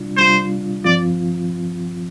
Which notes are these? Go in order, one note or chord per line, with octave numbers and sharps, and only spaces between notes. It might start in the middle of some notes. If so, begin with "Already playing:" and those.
Already playing: C3 G3 D4 F4
C3 G3 D4 F4 C5
G2 F3 C4 F4 D5